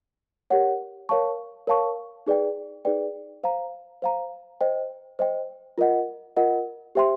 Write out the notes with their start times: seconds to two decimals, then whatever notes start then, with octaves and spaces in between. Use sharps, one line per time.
0.50 G4 A#4 C#5 F#5
1.09 A#4 C#5 F5 A5 C#6
1.67 A#4 C#5 F5 A5 C#6
2.27 D#4 G#4 B4 D5 G5
2.85 D#4 G#4 B4 D5 G5
3.43 C5 F5 A#5
4.02 C5 F5 A#5
4.61 C5 D#5 G5
5.19 C5 D#5 G5
5.78 F4 A#4 D#5 F#5
6.36 F4 A#4 D#5 F#5
6.95 G4 C5 E5 G5 C6